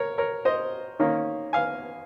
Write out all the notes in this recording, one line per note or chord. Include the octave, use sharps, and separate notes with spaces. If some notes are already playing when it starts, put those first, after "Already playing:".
Already playing: A#4 C#5
A#4 C#5
C5 D#5
D#3 A#3 C#4
F5 G#5